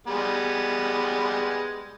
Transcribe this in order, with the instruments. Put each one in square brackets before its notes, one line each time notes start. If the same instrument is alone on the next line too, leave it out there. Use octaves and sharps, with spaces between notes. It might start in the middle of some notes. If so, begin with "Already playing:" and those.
[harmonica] G3 G#3 B3